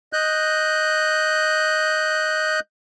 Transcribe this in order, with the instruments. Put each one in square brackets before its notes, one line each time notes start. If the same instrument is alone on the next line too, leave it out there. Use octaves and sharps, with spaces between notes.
[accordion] D#5 F#6 G6